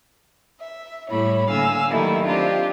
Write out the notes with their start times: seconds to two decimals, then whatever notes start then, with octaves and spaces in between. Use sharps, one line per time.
0.61 E5
1.10 A2 G3 A3 E4 C#5 B5
1.49 D3 A#3 F5 G#5 E6
1.90 D#3 F#3 G3 A3 A#3 E4
2.24 C4 D4 F4 G4